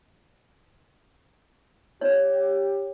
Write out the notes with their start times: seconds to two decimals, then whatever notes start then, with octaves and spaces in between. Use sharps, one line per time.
2.01 G4 C#5